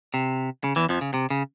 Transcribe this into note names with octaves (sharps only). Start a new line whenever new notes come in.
C3
C#3
E2 E3
F2 F3
C#3
C3
C#3